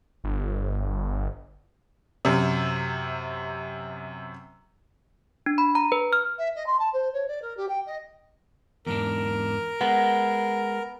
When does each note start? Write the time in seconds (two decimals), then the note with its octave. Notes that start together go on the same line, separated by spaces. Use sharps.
0.24 G1
2.25 F#2 C3
5.46 D4
5.58 B5
5.75 A#5
5.92 B4
6.13 F6
6.38 E5
6.55 D#5
6.66 C6
6.79 A5
6.93 C5
7.13 C#5
7.28 D5
7.42 A#4
7.57 G4
7.68 G5
7.86 D#5
8.87 E2 G#2 D4 A#4
9.81 G#3 B3